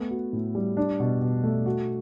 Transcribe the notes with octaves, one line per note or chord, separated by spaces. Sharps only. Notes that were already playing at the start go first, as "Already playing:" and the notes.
Already playing: A3 B3
F#4
A2
G3
D4
B2
B2
A3
F#4